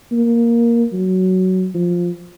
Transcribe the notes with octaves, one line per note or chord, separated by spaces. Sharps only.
A#3
F#3
F3